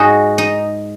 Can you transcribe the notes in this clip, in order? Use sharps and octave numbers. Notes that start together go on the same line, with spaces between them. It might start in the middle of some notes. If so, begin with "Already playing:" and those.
Already playing: G#2 F#3 D#4 F#4 G#4
D#4